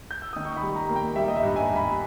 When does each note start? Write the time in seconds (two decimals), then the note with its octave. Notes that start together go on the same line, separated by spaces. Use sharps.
0.11 G6
0.22 E6
0.33 D#3 D#6
0.45 C#6
0.56 B5
0.62 G3
0.76 A#5
0.89 A#3
0.96 G5
1.16 G3 E5
1.28 D#5
1.36 E5
1.43 G2
1.56 G#5
1.69 G2
1.76 B5